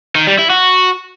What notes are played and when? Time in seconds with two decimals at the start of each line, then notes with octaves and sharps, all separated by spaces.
0.16 D#3
0.27 G3
0.39 E4
0.50 F#4